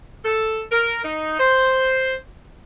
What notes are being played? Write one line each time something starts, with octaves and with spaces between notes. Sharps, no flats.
A4
A#4
D#4
C5